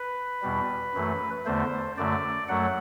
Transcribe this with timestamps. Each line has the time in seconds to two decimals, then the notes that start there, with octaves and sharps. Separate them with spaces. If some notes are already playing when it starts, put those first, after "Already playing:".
Already playing: B4
0.42 E2 B2 G3
0.94 F#2 E3 A3
1.46 E2 D3 A3 C5
1.97 F#2 D3 A3 D5
2.49 F#2 F#3 A3 F#5